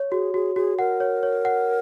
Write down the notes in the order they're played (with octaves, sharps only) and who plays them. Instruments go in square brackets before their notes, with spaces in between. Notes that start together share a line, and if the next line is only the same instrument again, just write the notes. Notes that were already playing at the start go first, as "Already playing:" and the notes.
Already playing: [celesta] C#5
[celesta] F#4 [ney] G#4
[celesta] F#4 [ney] G#4
[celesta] F#4 [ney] G#4
[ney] A#4 [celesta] F#5
[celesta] C#5
C#5
F#5